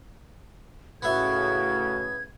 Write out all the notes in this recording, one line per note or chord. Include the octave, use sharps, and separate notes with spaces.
A2 C#3 B3 F#4 E5 G#6